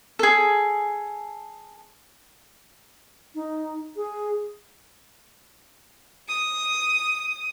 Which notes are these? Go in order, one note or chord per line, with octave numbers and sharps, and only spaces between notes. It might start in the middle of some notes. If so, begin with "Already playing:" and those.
G#4 A4
D#4
G#4
D#6